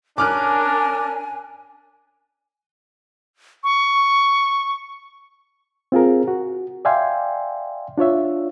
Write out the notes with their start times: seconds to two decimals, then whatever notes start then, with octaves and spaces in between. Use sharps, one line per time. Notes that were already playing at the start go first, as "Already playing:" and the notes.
0.18 C#4 D4 A#4 G#5 D6 F6 F#6
3.64 C#6
5.92 C4 F4 G#4 A#4
6.28 F#4
6.85 D5 E5 F5 G5 G#5 C6
7.98 D4 F4 C#5 E5